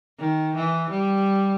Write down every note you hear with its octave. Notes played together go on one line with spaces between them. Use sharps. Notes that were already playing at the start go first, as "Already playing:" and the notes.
D#3
E3
G3